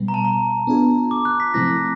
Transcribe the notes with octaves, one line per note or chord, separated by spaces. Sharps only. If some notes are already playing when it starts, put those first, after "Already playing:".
Already playing: B2 G3 B3
A#5
A5
A#5
B3 D4 F4 G#4
D6
F#6
B6
C3 F3 A3 C4 E4 A#6